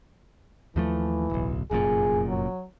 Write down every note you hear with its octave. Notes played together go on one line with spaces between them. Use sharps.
D#2 E3 F3 A3
D1 B1
F1 F#2 A#2 G#4
F#3